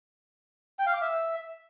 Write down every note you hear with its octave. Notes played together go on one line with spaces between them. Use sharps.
G5
F5
D6
E5